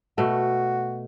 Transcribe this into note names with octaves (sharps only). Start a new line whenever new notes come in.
B2 A3 F#4